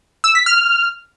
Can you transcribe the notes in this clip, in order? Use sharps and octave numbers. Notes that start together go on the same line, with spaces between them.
E6
B6
F6